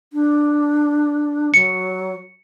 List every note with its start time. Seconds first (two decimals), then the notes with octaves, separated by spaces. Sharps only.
0.13 D4
1.54 F#3 C#7